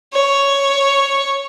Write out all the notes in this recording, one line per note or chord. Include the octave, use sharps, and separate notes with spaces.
C#5